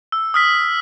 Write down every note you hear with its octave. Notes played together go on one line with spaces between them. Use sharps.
E6
D#6 F6 B6